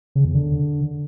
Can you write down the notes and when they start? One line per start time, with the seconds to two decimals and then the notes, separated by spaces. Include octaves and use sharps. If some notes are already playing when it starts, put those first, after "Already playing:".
0.15 C#3
0.25 E2
0.34 D3